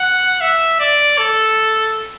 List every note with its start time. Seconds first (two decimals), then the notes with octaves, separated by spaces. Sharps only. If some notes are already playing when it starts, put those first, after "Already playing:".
Already playing: F#5
0.41 E5
0.80 D5
1.18 A4